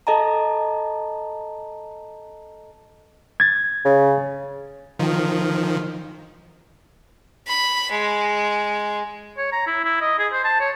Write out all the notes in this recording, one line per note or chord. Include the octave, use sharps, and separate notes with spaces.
A4 D#5 A5 A#5
G#6 A6
C#3
D#3 F3
B5
G#3
C#5
A#5
E4
E4
D#5
G#4
C5
A5
C#5